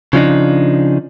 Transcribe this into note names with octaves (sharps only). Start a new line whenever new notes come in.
C#3 F3 D4 D#4